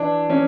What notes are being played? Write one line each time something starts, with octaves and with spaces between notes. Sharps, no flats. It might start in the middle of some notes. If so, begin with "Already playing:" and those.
Already playing: E3 D4
E3 C#4